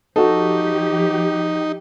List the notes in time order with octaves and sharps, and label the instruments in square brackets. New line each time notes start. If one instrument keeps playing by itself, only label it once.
[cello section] F3 G4 [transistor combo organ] D#4 [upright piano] F#4 A4